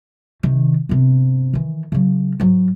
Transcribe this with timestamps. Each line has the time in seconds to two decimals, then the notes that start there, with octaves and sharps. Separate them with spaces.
0.43 C3 D#3
0.89 G1 C3
1.53 D#3 E3
1.92 C#3 F#3
2.40 G#2 F#3